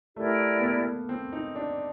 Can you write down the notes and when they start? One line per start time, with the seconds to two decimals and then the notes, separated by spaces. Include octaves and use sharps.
0.16 A3 E4 G4 A#4 D5
0.58 B3
0.63 A#3
1.09 C4
1.33 D#4
1.56 D4